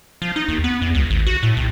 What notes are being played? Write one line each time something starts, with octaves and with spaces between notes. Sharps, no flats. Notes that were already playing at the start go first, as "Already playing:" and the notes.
F3
D#4
D#2
B3
E2
C#2
G#1
F#4
A2
C2